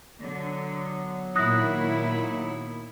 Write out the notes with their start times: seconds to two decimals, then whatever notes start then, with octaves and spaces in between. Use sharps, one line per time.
0.23 D3 F#3 B3
1.36 A#2 D#3 E4 D#6 F#6 A#6